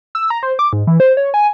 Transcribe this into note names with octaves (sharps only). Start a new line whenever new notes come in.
E6
A#5
C5
D6
G#2
E3
C5
C#5
G#5